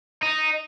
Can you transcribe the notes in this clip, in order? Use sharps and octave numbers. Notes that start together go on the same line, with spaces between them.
D#4